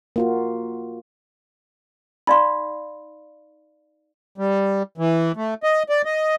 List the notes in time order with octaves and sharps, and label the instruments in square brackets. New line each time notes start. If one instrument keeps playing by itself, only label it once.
[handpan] A#3 F4 F#4
[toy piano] D#4 D5 F5 [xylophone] B5 C6
[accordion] G3
E3
A3
D#5
D5
D#5